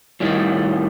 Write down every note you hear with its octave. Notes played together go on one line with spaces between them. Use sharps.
A2 D#3 G3